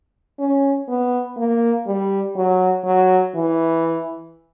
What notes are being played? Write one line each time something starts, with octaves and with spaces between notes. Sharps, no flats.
C#4
B3
A#3
G3
F#3
F#3
E3